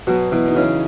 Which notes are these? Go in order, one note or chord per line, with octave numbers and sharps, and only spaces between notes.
B2 F#3 F#4
B2 E3 E4
D#4
C#3 E3 E4